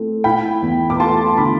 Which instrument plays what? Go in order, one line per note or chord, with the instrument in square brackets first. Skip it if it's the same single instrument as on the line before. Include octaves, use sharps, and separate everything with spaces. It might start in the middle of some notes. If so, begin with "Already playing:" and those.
Already playing: [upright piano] A3 C4 E4
E4 G5 B5
E2
D6
A3 A5 C6
D3 B5 D6